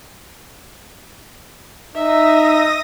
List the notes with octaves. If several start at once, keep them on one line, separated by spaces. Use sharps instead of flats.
D#4 E5 D#6 A#6